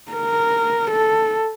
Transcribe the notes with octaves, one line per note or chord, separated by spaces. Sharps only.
A#4
A4